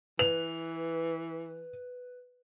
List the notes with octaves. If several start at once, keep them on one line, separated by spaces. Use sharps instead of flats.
E3 B4 F7